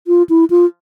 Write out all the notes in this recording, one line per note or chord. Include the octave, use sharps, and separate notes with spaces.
F4
E4
F4